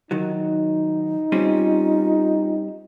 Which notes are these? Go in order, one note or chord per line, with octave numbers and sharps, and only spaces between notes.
D#3 F#3 D#4
G3 C4 C#4 F4